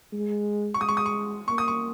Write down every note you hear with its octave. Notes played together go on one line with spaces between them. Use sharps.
G#3
C#6
G#3 D#6
C#6
D#6
C#6
A#3 C#6
D#6
C#6